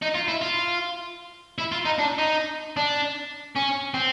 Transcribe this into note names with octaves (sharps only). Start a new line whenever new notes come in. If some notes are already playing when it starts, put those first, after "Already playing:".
D#4
F4
E4
F4
E4
F4
D#4
D4
D#4
D4
C#4
C4